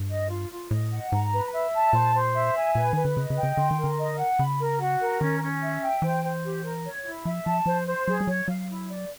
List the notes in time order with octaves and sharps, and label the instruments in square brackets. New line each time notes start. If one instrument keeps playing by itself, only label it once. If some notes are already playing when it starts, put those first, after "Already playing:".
Already playing: [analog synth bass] G2
[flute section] D#5
F4
F4
[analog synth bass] A2 [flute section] D#5
[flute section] F#5
[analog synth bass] G#2 [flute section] A#5
[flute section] B4
E5
A5
[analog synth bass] A#2 [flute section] C5
[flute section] C5
E5
G#5
[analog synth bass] A#2 [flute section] B4
[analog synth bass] D#3 [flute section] B4
[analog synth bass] D3
[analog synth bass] C#3 [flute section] D#5
[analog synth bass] C#3
[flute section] G5
[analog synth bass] C#3
[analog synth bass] D3 [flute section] C6
[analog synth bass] D#3
[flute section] A#4
[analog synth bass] D3
[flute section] D#5
F#5
[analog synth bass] C#3 [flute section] B5
[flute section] A#4
F#4
A#4
[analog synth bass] D#3 [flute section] C#4
[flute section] C#4
E5
G5
[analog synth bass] E3 [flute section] C5
[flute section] C5
G4
A#4
C#5
E4
[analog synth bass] F3 [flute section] E5
[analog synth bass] F3 [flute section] A5
[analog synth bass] F3 [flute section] C5
[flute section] C5
[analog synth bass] F#3 [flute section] G#4
[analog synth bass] G3
[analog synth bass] F#3 [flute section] C#5
[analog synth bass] F#3 [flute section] F5
[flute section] E4
D5